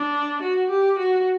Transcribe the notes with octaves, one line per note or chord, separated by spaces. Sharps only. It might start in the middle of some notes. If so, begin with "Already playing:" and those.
Already playing: D4
F#4
G4
F#4